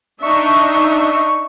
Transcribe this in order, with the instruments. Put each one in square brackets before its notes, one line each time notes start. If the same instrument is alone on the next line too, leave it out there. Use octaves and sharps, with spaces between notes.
[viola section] D4 D#4 E5 [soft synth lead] C#6